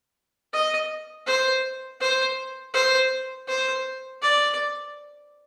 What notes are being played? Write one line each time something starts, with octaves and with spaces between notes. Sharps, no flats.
D#5
C5
C5
C5
C5
D5